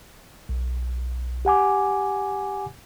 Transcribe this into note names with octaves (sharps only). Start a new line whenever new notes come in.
B1
G4 F#5 G#5 D6